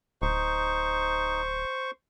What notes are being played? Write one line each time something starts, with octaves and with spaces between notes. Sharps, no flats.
D1 D#4 C5 C#6